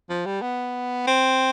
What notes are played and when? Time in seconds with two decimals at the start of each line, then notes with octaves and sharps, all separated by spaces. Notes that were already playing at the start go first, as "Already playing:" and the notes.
0.10 F3
0.26 G3
0.42 B3
1.07 C4